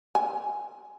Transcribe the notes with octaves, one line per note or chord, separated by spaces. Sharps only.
G#5